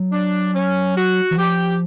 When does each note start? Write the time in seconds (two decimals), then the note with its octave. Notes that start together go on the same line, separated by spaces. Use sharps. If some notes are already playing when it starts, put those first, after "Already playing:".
Already playing: F#3
0.12 D4
0.54 C#4
0.96 F#4
1.31 E3
1.37 F3 G4